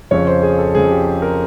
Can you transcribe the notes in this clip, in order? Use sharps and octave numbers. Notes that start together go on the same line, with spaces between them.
F2 C#3 F3 C#5
C5
G#4
A4
F2 C#3 F3 G#4
G4
A#4